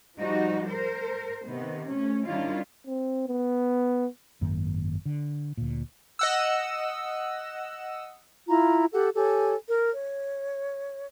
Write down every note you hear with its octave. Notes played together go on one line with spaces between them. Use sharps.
F3 G3 D#4 F#4
A#4 C5
C3 D#3 B3
A3 C#4
D#3 G3 C#4 D4 E4 F4
C4
B3
G#1 F#2 D#3 A#3
D3
D2 A#2
D#5 F#5 E6
E4 F4 A#5
G4 A4 F#5
G4 A4 C#5 G#5
A#4
C#5